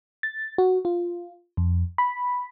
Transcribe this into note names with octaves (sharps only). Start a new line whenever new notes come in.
A6
F#4
F4
F2
B5